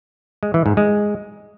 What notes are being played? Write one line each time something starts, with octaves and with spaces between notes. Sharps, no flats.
G#3
E3
G#2
G#3